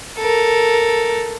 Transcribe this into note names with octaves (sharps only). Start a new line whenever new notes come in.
A4 A#4